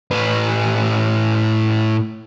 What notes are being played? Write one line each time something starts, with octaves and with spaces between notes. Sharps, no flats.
A2 B4